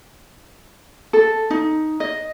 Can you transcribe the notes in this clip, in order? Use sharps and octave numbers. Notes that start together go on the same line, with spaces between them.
A4
D#4
D#5